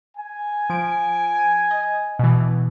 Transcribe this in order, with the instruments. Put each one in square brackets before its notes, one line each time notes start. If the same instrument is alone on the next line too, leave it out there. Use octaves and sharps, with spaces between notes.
[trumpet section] G#5
[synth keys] F3 D7
D#5
B2 E3